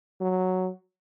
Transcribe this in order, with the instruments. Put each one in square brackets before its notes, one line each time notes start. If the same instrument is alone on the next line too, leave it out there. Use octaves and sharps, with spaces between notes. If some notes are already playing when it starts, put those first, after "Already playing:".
[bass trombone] F#3